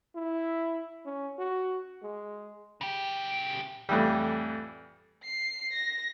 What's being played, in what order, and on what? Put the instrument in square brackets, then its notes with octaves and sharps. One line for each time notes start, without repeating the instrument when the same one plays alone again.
[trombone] E4
C#4
F#4
G#3
[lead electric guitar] C#3 G4
[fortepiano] F2 A2 E3 G3
[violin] C7
A#6